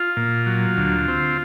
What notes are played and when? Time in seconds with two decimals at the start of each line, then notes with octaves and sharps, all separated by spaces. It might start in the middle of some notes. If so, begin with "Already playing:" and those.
Already playing: F4
0.17 A#2
0.46 F#3
0.77 D2
1.08 C4